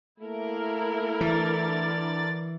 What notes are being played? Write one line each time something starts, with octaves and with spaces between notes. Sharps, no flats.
A3 A#3 E4 A#4
D3 E3 D5 A6